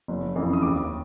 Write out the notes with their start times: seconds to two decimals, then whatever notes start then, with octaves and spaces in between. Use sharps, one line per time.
0.08 F#1
0.35 F2 C#3 E3
0.53 D#6
0.62 D#2 D6